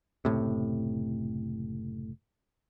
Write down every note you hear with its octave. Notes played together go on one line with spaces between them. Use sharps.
F#1 B1 A2 C3